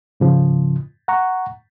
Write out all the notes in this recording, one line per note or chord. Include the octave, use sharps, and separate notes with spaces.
G#2 C#3 F3
F#5 A#5 C#6